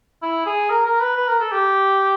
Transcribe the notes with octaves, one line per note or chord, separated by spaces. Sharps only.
E4
G#4
A#4
A#4
B4
B4
A#4
A4
G4